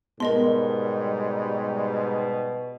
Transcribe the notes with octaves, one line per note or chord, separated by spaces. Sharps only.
G#2 B2 G3 B3 A#4 D#5 C6